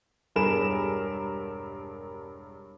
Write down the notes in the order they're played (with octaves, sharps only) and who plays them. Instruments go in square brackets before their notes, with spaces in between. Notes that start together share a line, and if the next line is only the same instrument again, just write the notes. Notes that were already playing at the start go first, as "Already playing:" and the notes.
[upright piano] E1 G2 G#4 A#4 B5 E7